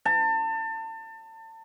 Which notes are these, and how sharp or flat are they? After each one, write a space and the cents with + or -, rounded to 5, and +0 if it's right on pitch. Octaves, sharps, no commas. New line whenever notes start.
A5 +30